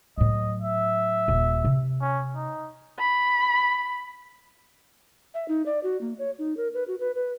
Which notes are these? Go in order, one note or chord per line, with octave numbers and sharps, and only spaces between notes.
A2 F#3 D#5
E5
D#1
C3
C#4
D#4
B5
E5
D#4
D5
F#4
A#3
C#5
D#4
A#4
B4
F#4
B4
B4